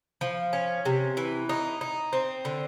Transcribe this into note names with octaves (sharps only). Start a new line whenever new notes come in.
F3
C#4
C3
E3
D#4
D#4
C4
D3